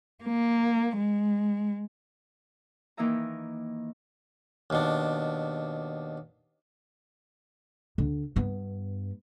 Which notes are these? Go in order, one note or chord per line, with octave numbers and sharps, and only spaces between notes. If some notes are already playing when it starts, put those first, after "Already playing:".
A#3
G#3
D#3 E3 A#3 D#4 E5 A#5
D#2 B2 D4
D2 D3
G2 B3